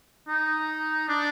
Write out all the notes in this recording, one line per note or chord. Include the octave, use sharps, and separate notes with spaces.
D#4
D4